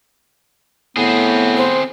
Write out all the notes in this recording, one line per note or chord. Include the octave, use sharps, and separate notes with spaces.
A2 B3 C4 G#4
C5